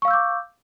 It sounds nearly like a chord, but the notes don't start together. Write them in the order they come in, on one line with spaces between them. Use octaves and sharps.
C#6 F5 E6 G6 D6